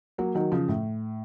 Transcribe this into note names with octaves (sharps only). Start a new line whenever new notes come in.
F#3 A#3
D#3 F#3
C#3 F3
A2